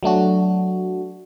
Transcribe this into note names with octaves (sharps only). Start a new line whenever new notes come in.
F#3 A3 D4 F#4